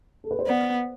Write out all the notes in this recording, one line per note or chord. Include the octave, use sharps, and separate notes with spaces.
A4
B4
C5
B3 D5